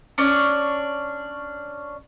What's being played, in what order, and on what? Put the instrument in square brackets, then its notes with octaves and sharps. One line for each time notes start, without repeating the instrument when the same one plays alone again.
[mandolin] C#4 D4 C#5 D5